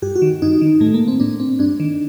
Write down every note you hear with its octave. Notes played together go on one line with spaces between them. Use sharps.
G2 G4
F#4
D#3
G2 D#4
D#3
A2 A3
A#3
C4
A2 D4
C4
G2 D4
D#3